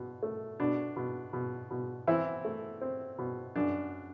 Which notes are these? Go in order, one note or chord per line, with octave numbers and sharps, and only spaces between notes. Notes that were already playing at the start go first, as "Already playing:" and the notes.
Already playing: B2
A3
B2 D4
B2
B2
B2
E3 C4 E4
A3
C4
B2
F#2 D4